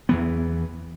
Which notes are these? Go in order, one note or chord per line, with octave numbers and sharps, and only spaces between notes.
E2 E3 B3